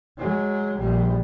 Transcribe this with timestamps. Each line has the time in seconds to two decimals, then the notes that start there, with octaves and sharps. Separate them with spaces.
0.18 F#3 G#3
0.79 A#1 G3